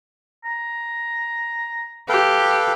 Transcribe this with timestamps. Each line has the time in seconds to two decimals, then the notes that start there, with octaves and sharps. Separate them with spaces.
0.45 A#5
2.09 G4 A4 B4 F5